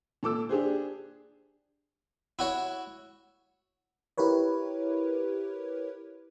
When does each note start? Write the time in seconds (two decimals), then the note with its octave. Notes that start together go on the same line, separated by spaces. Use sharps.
0.23 A#2 A4 D6 E6
0.49 D4 G4 G#4 C5
2.39 E4 F#4 C#5
4.18 E4 G4 A#4 B4 C#5